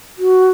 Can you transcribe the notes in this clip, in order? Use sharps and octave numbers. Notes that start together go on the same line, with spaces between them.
F#4